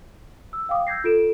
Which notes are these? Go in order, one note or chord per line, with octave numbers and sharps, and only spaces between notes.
E6
F5 G5 D6 D#6
E6 G6 G#6 A#6 C7
F4 A4 D7 E7